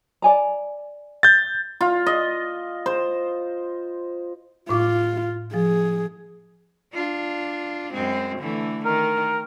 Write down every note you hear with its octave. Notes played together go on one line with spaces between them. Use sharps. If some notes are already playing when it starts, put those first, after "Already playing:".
D5 G#5 A#5
G6 A6
F4
D#5
C5
A2 F4 D6
F3 G#4
D4 F4
F#2 G#3 C4
D3 E3 A3
D#3 A#4